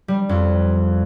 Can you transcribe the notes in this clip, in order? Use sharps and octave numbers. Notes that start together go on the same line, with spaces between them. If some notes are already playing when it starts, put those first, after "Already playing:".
G3
F2